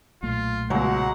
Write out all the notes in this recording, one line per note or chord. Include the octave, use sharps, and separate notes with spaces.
B1 A#2 A3 F4
C#2 B2 F#3 G#3 F#5